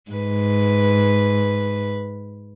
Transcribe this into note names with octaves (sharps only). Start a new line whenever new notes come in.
G#2 B4